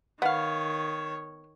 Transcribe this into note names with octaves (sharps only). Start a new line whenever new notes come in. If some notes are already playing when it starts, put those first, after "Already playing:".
D#3 B3 C#5 F5 F#5